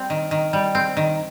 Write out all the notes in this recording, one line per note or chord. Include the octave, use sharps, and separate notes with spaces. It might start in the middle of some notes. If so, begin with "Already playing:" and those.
Already playing: G3 C4
D#3
D#3
G3
C4
D#3